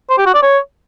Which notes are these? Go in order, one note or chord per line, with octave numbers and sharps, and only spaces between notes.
C5
G4
F#4
D5
C#5